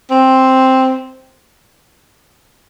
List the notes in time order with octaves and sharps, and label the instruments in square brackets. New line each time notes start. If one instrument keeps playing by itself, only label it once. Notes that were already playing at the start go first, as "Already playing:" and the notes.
[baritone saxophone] C4